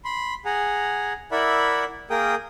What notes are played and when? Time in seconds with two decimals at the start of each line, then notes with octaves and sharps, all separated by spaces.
0.05 B5 C6
0.45 G#4 F#5 G#5 A#5
1.32 E4 A#4 D5 E5 F#5 B5
2.10 A#3 G#4 A#4 G5 D#6